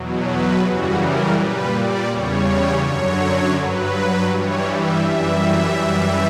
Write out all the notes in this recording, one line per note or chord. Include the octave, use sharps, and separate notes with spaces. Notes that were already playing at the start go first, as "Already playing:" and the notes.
Already playing: E2 B2 F#3
B4
F#2 C#3 E3 G3 F#4
A#4
A#2 G3 B4
D5
E2 C#3 G3 C#5
F#2 D3 F#3 C#5
G2 F#3 B4
G2 E3 G3 C#5
E5
F#2 E3 G3 E5
F#2 E3 G3